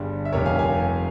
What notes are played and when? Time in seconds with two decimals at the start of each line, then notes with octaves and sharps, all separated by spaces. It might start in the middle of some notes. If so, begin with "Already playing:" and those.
Already playing: G1 G2 G3 G#4
0.25 E5
0.32 F1 F2 C3 A#4 C#5
0.46 F5 G#5
0.59 F5 G#5